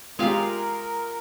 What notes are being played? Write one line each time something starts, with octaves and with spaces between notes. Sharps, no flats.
G#3 F4 G4 G#4 A#4 F5